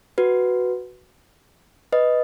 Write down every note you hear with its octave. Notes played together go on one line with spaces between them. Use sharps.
F#4 B4
B4 D#5